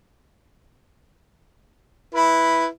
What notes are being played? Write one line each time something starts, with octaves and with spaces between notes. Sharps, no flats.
E4 B4